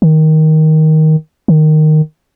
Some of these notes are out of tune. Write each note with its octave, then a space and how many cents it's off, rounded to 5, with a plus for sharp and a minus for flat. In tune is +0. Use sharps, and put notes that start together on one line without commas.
D#3 +10
D#3 -10